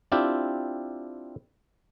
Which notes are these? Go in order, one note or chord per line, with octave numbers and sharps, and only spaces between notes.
C4 D4 E4 F4 G4